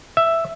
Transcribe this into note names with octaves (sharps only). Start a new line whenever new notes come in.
E5